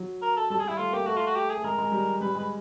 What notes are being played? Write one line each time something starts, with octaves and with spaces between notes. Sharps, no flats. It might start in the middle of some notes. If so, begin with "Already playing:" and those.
Already playing: F#3
A#4
A4
G3 A4
G#4
G3
E4
A3 F4
A#3 G4
A3 F#4
F4
F#4
G4
G#4
A3
G#3 A#4
G#3
G3
G3 B4
G#3 B4